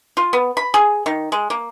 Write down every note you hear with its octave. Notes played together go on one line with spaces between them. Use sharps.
F4
B3
B5
G#4
D#3
G#3
A#3